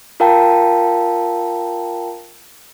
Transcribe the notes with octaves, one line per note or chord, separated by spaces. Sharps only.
F4 A#4 F5 G5 A5 A#5